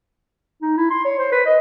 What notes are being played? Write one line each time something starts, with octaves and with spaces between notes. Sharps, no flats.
D#4
E4
C6
C#5
C5
B4
D#5